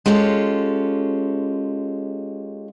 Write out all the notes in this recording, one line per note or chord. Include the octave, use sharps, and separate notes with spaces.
G#3 C#4 F4 G4 A4